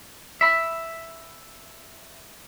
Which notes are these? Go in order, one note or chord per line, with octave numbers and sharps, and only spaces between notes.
E5 B5